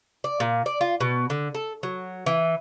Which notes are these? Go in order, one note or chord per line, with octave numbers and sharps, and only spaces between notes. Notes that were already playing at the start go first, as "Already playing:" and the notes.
D5
A#2
D5
F4
B2
D3
A4
F#3
E3